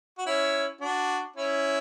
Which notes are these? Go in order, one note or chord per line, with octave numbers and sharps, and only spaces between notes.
F#4
C#4 E4
D4 F#4
C#4 E4